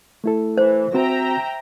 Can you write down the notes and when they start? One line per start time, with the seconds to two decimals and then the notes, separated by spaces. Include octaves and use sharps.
0.24 A3 E4 A4
0.58 E3 C5
0.94 C4 F#4 E5 G5 A#5